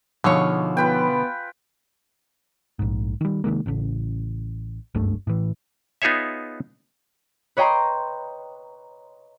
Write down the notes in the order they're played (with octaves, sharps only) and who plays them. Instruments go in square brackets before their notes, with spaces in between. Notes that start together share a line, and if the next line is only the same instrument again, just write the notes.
[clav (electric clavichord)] B2 D3 [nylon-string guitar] F3 D#4 C#5 [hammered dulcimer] G#4 F5
[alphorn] B3 [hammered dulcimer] F4 B4 G5
[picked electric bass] A#1 G#2
D#3 G3
C3 D#3 G#3 A#3
A1 C#3
F#1 C#2 G2 A3
A2 E3
[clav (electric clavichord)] B3 D#4 F4 G#4 C#5 E5
[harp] B4 C#5 D#5 G5 A#5 C6